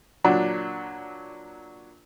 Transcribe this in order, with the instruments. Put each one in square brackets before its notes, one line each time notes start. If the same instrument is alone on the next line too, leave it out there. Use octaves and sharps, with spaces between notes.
[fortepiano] A#2 F#3 D4